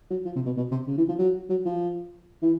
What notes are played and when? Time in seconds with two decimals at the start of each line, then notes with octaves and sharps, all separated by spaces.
0.10 F#3
0.25 F3
0.36 C3
0.46 B2
0.57 B2
0.71 C3
0.88 C#3
0.98 E3
1.09 F3
1.19 F#3
1.50 F#3
1.65 F3
2.42 E3